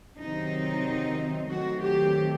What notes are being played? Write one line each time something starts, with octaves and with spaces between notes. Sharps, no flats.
C3 D#3 F#3 C4 D#4
D#3 F#3 A3 C4 F#4
G4